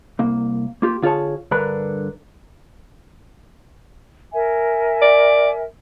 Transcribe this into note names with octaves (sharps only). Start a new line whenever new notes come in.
C2 A#3
A#3 F4 G4
D3 F4 G#4 C#5 A5
G2 D3 D4 A#4 B4 B5
A#4 E5 G#5
D5